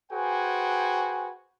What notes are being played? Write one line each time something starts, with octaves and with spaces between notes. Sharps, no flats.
F#4 G#4 B4 C5 G5 G#5